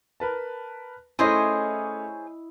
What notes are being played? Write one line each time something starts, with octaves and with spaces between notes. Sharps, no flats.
A#4 B4 A5
A3 C#4 E4 G#4 C5 C#5 D#5